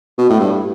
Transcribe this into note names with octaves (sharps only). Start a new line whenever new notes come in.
B2
A2
G2